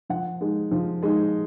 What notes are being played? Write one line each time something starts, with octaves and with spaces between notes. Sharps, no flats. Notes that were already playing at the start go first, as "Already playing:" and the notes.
F3 F#5
G#3 D#4
F3
G#3 D#4